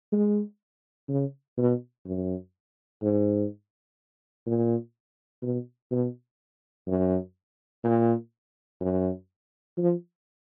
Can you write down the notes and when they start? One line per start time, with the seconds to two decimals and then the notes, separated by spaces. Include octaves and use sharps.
0.12 G#3
1.09 C#3
1.57 B2
2.05 F#2
3.02 G#2
4.46 A#2
5.43 B2
5.91 B2
6.87 F#2
7.84 A#2
8.81 F#2
9.77 F3